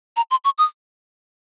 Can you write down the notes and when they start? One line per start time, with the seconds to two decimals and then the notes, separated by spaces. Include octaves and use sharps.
0.17 A#5
0.31 C6
0.45 C#6
0.58 D#6